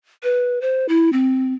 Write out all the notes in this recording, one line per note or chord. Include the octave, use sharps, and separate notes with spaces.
B4
C5
E4
C4